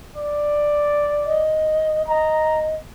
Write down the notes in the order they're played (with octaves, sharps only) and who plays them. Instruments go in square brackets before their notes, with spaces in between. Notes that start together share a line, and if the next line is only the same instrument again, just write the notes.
[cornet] D5
[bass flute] D#5
[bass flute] D#5 [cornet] A#5